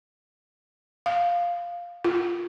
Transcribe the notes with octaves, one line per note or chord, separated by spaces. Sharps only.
F5
F4